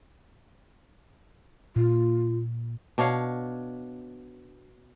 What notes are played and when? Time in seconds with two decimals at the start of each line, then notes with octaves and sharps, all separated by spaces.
1.76 A#2 F4
2.98 B2 D4 C#5 F5